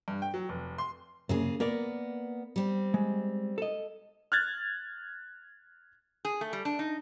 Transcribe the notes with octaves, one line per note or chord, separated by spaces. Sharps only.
G2
G5
F#3
F1
C6
C2 F#2 C#3 A#3 G#4
A#3 B3 A#4 D5
G3 C4
G#3
A4 D#5
F6 F#6 G#6 A6
G#4
A3
G3
D4
D#4